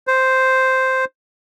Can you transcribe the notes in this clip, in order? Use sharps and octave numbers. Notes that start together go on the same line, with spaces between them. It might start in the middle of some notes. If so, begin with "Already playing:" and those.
C5